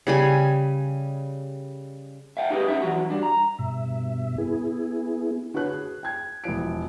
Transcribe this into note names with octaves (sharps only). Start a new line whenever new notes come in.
C#3 G3 G#5
E5 F5 G5
D#4 G4 G#4 B4 D#5
B3 C#4 D#4 E5
E3 F#3 F#4
G2 D4
A#5
G2 B2 E5
B3 E4 G#4
D3 F#4 B4 C#5 F#6
G#4
G5 G#6
E1 E3 F3 D7